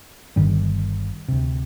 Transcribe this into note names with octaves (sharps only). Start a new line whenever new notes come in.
G1 G2 D3 D#3 G3
D2 C3